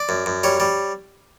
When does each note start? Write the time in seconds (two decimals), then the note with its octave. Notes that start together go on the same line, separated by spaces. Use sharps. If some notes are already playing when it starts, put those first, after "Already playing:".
Already playing: D5
0.09 F#2
0.26 F#2
0.43 G3 C#5
0.60 G3